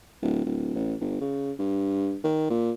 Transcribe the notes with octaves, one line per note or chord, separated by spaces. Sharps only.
D1
D1
A1
G1
C#3
G2
D#3
A#2